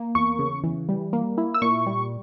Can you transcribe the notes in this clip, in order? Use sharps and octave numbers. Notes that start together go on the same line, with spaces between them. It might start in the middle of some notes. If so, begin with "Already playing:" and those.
Already playing: A#3
E2 C#6
C#3
E3
G3
A#3
E4
E6
A#2 C#6
G3